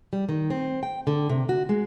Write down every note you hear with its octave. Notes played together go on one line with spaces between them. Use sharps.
G3
D#3
C4
G5
D3
C3
F#4
G#3